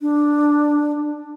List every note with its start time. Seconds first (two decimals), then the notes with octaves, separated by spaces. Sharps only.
0.01 D4